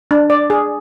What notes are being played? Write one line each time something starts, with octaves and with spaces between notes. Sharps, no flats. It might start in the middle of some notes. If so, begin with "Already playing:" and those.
D4
D5
G#4